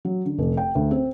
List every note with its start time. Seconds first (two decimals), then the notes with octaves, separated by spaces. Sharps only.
0.05 F#3
0.25 D3
0.38 F1
0.57 G5
0.75 D2
0.91 C4